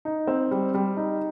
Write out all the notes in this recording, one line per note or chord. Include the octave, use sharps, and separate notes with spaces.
D#4
C4
G3
G3
D#4